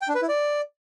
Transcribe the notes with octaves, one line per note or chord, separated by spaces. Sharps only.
G5
D4
B4
E4
D5